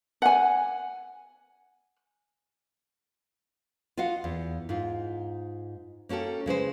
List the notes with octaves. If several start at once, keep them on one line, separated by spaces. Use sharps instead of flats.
F#5 G#5
F4 F#4 D#5 F5 F#5
E2
G#2 F4
A#3 C#4 F#4 A4 G5
C#3 G#3 B4 C5